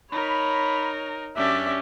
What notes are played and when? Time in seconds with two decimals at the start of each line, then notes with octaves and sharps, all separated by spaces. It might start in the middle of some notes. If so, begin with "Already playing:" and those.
0.12 D#4 A#4 C#5 B5
1.36 F#2 C#4 D4 G4 D5 E5